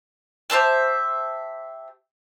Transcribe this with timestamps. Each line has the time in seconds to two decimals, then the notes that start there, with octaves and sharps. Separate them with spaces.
0.50 G4 C5 E5 A5